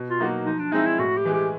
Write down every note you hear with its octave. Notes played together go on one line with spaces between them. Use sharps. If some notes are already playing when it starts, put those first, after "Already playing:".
Already playing: B2
F4
F#3 A#3 D#4 F#4
F3 D#4
D4
G#3 C4 D#4 E4
E4
A2 F#4
G4
E3 G#3
G4